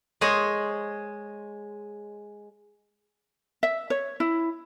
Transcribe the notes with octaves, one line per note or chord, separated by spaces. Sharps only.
G#3 G#4 C5 C#5 D#5
E5
C#5
E4